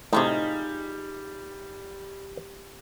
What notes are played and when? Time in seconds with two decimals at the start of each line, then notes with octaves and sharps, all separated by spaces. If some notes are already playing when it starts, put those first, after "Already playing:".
0.13 A2 C3 G3 D#4 F4 G#4